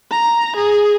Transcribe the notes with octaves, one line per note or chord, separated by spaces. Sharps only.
A#5
G#4